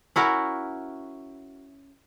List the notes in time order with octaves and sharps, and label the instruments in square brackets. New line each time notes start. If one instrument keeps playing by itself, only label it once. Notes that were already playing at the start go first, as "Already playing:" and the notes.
[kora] C#4 E4 F#4 A#4